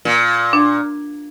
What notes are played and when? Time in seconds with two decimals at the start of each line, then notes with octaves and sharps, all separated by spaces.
0.05 A#2
0.53 D4